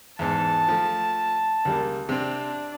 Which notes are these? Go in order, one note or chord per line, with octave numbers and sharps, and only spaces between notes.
E2 G#2 A5
F3 A3
C#2 G3 A#3
C3 C4 D4